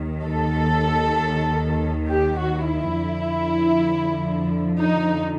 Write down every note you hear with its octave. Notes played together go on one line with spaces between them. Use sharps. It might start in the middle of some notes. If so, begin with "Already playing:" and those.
Already playing: D#2 D#3
A4
G4
F#4
E4
F2 D3 F3
D#4